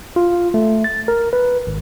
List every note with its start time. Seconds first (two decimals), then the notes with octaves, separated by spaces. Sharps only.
0.16 F4
0.54 A3
0.84 A6
1.08 A#4
1.33 B4
1.67 G#1